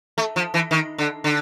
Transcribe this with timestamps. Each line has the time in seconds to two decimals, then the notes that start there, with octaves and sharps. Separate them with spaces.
0.18 A3
0.36 F3
0.54 E3
0.71 D#3
0.98 D3
1.24 D3